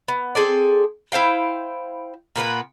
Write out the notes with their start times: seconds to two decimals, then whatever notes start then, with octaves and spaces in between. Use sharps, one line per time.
0.08 B3
0.35 C4 G#4 A4 D5
1.12 E4 C5 F5 G5
2.36 A#2 A#3 B3 B4